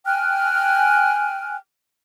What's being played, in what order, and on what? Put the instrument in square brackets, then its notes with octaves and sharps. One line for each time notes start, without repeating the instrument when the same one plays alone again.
[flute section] G5 G#5 F6 F#6